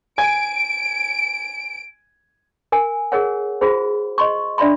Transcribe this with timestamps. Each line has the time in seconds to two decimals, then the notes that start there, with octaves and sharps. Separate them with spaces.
0.18 G#5 G#6 D7
2.72 A#4 G#5
3.12 G#4 A#4 C#5 F#5
3.61 F4 F#4 G#4 C5
4.18 D#5 C6 C#6
4.58 D4 D5 E5 B5 C6